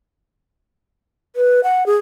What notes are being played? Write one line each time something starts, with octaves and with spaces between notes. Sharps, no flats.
B4
F#5
G#4